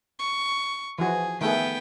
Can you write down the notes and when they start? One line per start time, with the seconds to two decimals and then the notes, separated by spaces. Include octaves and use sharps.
0.19 C#6
0.99 E3 F3 F#4 G#4
1.41 D#3 A3 B3 G#4 G5